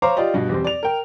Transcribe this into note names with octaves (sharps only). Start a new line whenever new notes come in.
C5 C#5 F5 A#5 D6
F4 G4 D5 D#5
G2 B2
E2 G3 C4
D5 F7
A#4 G5